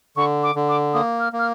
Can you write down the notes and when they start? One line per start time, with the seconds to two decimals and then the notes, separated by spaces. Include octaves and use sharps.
0.16 D3 C#6
0.43 D6
0.55 D3
0.68 D6
0.93 A#3 D#6
1.20 F6
1.33 A#3
1.39 F6